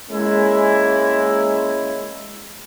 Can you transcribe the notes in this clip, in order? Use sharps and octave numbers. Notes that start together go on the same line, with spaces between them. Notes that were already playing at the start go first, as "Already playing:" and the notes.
G#3 A#3 C#4 E4